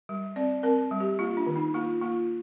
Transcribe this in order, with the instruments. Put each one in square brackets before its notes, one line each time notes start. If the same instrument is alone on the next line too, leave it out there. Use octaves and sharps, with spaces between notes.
[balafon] G3
C4 D5
C4 A#4
G3
G4
A#3 F4
D4
D#3
D#4
A#3 F4
A#3 F4